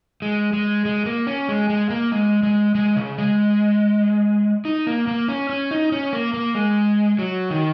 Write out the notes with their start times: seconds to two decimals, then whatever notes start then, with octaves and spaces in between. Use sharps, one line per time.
0.22 G#3
0.53 G#3
0.85 G#3
1.06 A#3
1.27 C#4
1.48 G#3
1.70 G#3
1.90 A#3
2.12 G#3
2.43 G#3
2.75 G#3
2.96 C#3
3.18 G#3
4.65 D#4
4.87 A#3
5.08 A#3
5.28 C#4
5.49 C#4
5.71 D#4
5.92 C#4
6.13 A#3
6.34 A#3
6.55 G#3
7.19 F#3
7.50 D#3